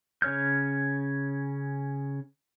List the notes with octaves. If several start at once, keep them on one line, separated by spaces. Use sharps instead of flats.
C#3 C#4 C#5 F6 G6